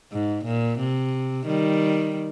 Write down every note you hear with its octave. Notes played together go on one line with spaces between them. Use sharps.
G#2
A#2
C3
D#3 G3